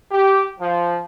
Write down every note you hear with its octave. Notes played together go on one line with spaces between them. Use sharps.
G4
F3